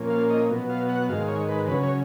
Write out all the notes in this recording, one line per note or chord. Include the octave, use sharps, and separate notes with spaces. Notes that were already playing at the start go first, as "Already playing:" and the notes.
Already playing: A#2 F3 A#3 C#4
F5
D#5
B2 F#3 B3
F5
F#5
G#2 D#3 G#3 F5
C#5
B4
C#3 F#3 C#4 B4
C#5